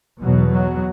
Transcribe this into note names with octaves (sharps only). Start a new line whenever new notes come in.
E2 B2 F#3
F#3